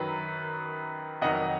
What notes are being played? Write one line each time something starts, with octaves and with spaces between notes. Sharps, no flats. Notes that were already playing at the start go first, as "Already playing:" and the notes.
Already playing: F#2 D#3 F#3 B4
F2 D#3 F#3 D#5 F#5